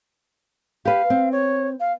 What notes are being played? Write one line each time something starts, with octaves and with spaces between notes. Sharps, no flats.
G4 B4 F5
C4
C#5
F5